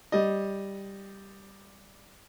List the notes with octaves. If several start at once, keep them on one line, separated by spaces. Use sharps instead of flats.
G3 D#5